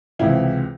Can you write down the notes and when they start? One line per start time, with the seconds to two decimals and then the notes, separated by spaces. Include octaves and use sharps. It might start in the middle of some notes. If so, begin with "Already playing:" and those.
0.19 C#2 C3 E3 E4